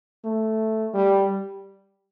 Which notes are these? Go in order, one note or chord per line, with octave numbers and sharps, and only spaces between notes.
A3
G3